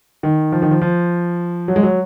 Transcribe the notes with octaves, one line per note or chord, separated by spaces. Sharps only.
D#3
F3
D#3
F3
F3
F#3
G#3
F#3